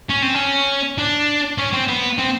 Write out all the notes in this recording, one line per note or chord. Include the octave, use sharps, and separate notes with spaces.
C#4
C4
C#4
D4
C#4
C4
B3
C4